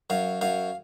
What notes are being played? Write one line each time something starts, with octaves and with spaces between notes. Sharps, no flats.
F#2 F5
F#2 F5